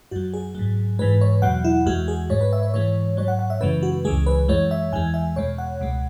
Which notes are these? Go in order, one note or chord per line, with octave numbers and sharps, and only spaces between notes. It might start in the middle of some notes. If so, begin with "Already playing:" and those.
F#2 F#3 F#4
G#4
G#2 F#3
G#2 E3 G#3 B4
C#5
E2 B2 F#3 F#5
E4
E2 E3 G#3 F#4
G#4
G#2 G#3 C#5
B4
E5
C#5
G#2 E3 G#3 C#5
G#2 F#3 C#5
F#5
F#5
E5
F#2 C#3 E3 G#3 B4
F#4
C#2 C#3 E3 G#3 G#4
B4
F#2 E3 G#3 C#5
E5
E2 E3 G#3 G#5
E5
E2 B2 G#3 C#5
F#5
C#2 B2 G#3